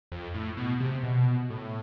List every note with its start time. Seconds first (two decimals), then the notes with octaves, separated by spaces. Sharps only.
0.12 F2
0.34 A2
0.57 B2
0.80 C3
1.03 B2
1.50 A2